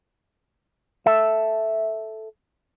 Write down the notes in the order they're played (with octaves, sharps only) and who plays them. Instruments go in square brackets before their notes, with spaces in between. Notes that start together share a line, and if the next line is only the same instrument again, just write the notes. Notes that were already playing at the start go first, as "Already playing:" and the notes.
[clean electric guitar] A4 E5